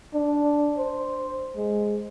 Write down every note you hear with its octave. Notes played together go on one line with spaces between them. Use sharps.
D4
C5
G#3